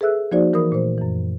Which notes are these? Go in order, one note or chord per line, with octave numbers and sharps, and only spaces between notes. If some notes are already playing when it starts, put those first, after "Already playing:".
G#4 A4 B4 E5 E6 F#6
F3 A#3 D#4 F#4 C5 D5
E3 A#4 B5 D#6
A#2 A3 C5
F#2 E3